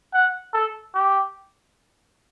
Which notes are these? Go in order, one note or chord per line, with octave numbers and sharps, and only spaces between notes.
F#5
A4
G4